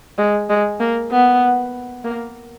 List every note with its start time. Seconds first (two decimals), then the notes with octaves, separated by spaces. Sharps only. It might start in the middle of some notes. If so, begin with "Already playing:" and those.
0.18 G#3
0.50 G#3
0.80 A#3
1.12 B3
2.05 A#3